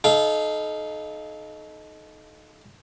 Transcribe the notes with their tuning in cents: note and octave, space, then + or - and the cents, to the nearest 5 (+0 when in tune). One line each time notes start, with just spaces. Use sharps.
D#4 +0 A4 -30 F5 -15